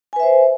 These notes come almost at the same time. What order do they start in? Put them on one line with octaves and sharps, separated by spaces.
G#5 B4 E5 C5